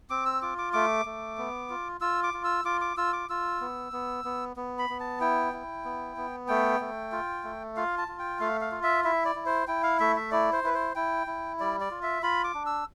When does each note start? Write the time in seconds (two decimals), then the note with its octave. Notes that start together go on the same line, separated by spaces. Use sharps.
0.10 C4 D6
0.26 E6
0.42 F4 D6
0.58 D6
0.73 A3 D6
1.05 A3
1.38 B3
1.70 F4
2.01 F4 E6
2.23 D6
2.34 F4
2.44 E6
2.65 F4 D6
2.81 D6
2.97 F4 E6
3.13 D6
3.30 F4 E6
3.61 B3
3.92 B3
4.25 B3
4.56 B3
4.78 B5
4.89 B3
5.00 A5
5.20 E4 G5
5.53 E4
5.85 B3
6.17 B3
6.48 A3 G5
6.80 A3
7.12 F4
7.44 A3
7.76 F4 F5
7.98 A5
8.08 F4
8.19 G5
8.40 A3 F5
8.61 F5
8.71 F4
8.83 E5
9.04 E4 E5
9.25 D5
9.35 E4
9.46 C5
9.68 E4 G5
9.83 F5
10.00 A3 E5
10.16 E5
10.31 E4 D5
10.53 C5
10.64 E4 B4
10.74 C5
10.95 E4 G5
11.27 E4
11.60 G3 D5
11.80 D5
11.91 F4
12.03 E5
12.23 F4 B5
12.44 D6
12.55 D4
12.66 E6